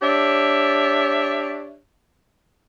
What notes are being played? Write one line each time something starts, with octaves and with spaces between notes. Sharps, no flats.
D4 G4 C#5 E5